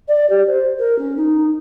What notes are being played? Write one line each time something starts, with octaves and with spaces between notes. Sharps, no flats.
D5
G4
C5
A#4
C#4
D#4